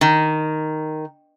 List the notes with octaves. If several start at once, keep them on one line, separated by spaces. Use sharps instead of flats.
D#3